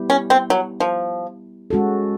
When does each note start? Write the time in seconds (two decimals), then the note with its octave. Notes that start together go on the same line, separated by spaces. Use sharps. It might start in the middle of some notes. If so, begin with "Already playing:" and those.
Already playing: G3 B3 E4 G4
0.10 C#4
0.30 C4
0.50 F#3
0.80 F3
1.70 G#3 C#4 F#4 A4